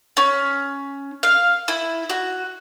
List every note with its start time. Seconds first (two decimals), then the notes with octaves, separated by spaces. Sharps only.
0.17 C#4
1.23 F5
1.68 E4
2.10 F#4